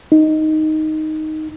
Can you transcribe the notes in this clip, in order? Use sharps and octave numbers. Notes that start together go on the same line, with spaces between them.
D#4